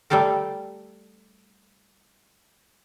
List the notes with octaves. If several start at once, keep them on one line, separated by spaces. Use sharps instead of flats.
G3 A3 G4 A4 A#4